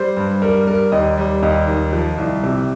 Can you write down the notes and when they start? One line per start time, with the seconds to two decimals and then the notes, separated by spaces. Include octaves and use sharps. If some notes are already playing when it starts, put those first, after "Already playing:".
Already playing: G3 C5
0.17 G2
0.42 G3 A#4
0.67 G3 A#4
0.92 D#2 D#5
1.18 G3
1.42 D#2 D#5
1.68 D#3
1.93 F3
2.18 C2
2.43 C3